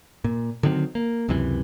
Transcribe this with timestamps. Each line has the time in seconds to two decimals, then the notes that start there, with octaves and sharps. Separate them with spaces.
0.24 A#2
0.63 D3 D#3 F#3 C4
0.95 A#3
1.29 C#2 F#2 C3 E3